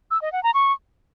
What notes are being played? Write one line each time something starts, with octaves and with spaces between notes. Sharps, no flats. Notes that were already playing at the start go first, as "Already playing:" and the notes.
E6
D#5
F#5
A#5
C#6